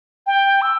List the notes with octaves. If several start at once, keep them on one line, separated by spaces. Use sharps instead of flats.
G5
E6